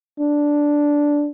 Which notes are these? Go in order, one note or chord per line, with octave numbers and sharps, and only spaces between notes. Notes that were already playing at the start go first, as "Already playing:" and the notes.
D4